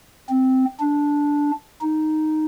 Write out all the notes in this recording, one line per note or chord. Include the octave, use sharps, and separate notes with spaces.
C4
D4
D#4